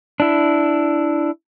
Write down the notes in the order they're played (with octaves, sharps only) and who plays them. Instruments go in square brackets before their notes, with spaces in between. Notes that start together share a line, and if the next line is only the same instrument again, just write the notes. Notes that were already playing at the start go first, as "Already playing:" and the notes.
[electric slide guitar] D4 E4